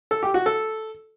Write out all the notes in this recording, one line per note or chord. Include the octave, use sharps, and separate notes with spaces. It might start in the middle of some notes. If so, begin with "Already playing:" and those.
A4
G4
F#4
A4